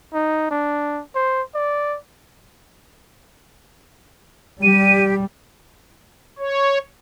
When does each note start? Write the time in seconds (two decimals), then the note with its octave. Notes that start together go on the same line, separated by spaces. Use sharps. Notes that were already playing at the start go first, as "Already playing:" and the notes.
0.14 D#4
0.51 D4
1.15 C5
1.55 D5
4.62 G3 G4 D#7
6.39 C#5